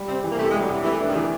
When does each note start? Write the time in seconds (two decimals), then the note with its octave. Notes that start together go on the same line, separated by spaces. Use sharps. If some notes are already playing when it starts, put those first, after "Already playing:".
Already playing: G3
0.08 C3 C4
0.24 E3
0.32 A#3
0.38 C3 A3
0.50 G#3
0.54 G3
0.62 F#3
0.69 C3 E3
0.84 E3 A3
1.01 D4
1.08 D#3
1.15 E3